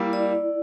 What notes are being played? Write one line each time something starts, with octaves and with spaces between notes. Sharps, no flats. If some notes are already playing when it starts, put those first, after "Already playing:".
Already playing: G3 A#3 E4
D5